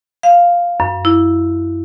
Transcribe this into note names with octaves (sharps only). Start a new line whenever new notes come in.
F5
F#2
E4